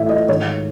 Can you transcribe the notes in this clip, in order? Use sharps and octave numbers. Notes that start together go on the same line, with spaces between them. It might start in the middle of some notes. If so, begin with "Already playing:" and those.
Already playing: A2 E3 E5
D#5
G#2 D#3 C#5